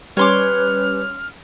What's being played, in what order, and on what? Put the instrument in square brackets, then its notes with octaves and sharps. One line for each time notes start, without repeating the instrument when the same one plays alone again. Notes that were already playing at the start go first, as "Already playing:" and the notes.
[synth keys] G3 C#4 [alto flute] B4 [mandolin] C#5 C6 D6 [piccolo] F6